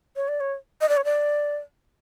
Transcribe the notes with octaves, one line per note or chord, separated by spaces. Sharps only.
C#5
D5
C#5
D#5
D5
C#5
D5